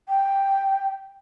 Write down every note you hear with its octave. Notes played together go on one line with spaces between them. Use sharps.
G5